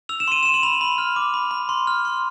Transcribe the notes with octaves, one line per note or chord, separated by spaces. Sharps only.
E6 F7
E7
C6 D#7
C6 E7
F#7
B5 F7
B5
F6
D6
B5
B5
C6
F6
C6